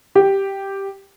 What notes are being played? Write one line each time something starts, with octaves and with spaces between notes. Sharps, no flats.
G4